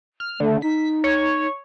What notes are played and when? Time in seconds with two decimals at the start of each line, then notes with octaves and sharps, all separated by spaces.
0.20 F6
0.40 D3 A3
0.62 D#4 B6
1.04 C#5